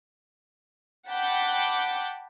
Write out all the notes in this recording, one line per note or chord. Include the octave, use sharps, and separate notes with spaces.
F#5 G5 A5 B5 D6 G6